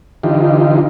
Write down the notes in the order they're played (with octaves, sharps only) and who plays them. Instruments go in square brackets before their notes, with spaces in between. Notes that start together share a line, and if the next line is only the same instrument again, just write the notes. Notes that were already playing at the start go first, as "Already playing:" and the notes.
[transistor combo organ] D3 E3 D#4 F4 G4